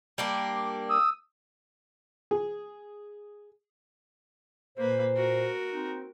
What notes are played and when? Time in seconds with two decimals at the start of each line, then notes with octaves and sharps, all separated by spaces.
0.18 G3 A#3 D4
0.90 D#6 E6
2.31 G#4
4.78 A#2 A#3 B4 C5
5.16 F#4 A#4
5.73 C4 D#4